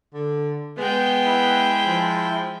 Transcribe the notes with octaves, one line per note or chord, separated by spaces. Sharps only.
D3
G#3 B3 G5
E4 E5
F3